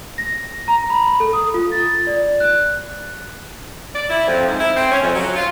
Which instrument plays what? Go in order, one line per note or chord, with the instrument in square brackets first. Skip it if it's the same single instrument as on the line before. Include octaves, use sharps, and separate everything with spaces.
[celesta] A#6
A#5
B5
A4
D#6
F4
A6
D5
F#6
[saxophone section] D5
E4
F2
G#2
E4
C4
C#4
F2
F#3
F4